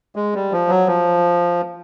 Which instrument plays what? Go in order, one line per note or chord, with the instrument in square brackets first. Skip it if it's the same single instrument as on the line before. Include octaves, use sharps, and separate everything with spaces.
[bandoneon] G#3
G3
F3
F#3
F3